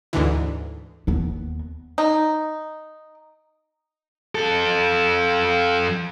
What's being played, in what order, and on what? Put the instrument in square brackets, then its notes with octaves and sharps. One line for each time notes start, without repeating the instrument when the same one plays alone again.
[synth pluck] D2 G#2 D3 E3
[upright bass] D#2 B3
[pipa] D#4
[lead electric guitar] F2 A4